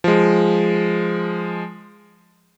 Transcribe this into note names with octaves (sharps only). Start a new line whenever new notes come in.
F3 G#3